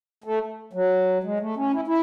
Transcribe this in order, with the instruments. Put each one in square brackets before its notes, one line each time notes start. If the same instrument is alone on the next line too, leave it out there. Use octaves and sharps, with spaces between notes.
[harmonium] A3
F#3
G#3
A3
C#4
E4
E4